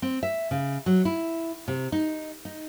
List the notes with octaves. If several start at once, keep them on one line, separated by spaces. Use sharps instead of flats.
C4
E5
C#3
F#3
E4
C3
D#4
D#4